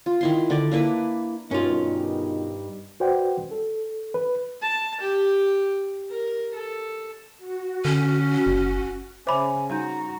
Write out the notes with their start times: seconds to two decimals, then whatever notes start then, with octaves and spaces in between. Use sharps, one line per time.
0.06 F4
0.21 D#3 E4 C6
0.50 D3 D5
0.71 A#3 D4 E4 B4
1.51 G2 B2 D#3 C#4 D#4 F4
3.00 F#4 B4 C5 D5 F#5 G5
3.51 A4
4.14 B4
4.62 A5
5.01 G4
6.10 A#4
6.54 A4
7.38 F#4
7.85 D3 C#4
8.47 F#1
9.27 C#3 C5 C#5 E5 G#5 B5 D6
9.70 G3 D#4 F#4 A#5 G6